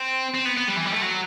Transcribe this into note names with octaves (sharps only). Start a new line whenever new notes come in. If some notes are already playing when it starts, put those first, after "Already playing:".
Already playing: C4
C4
B3
B3
G3
E3
G3
A3
F#3